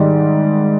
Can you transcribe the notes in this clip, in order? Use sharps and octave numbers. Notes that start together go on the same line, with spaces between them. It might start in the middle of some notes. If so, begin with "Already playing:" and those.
Already playing: G#2 D#3 G3 D5